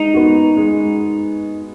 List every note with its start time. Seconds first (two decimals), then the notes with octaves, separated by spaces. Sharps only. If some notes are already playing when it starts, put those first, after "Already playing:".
Already playing: G#3 D#4
0.14 B3 F#4
0.57 G#3